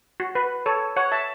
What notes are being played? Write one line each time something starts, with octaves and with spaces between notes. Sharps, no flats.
F#4
B4
A4 C#5
C#5 F#5
E5 A5